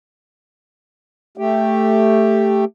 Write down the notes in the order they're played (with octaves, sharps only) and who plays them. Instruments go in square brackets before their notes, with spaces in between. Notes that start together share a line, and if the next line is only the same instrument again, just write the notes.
[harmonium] A3 G4